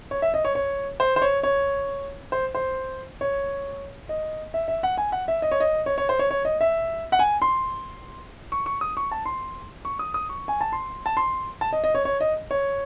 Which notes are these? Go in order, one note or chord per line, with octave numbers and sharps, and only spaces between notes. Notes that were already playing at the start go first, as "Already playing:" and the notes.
C#5
E5
D#5
C#5
C#5
C5
C5
C#5
C#5
C5
C5
C#5
D#5
E5
E5
F#5
G#5
F#5
E5
D#5
C#5
D#5
C#5
C#5
C5
C#5
C#5
D#5
E5
F#5
G#5
C6
C#6
C#6
D#6
C#6
A5
C6
C#6
D#6
D#6
C#6
G#5
A5
C6
A5
C6
A5
D#5
D#5
C#5
C#5
D#5
C#5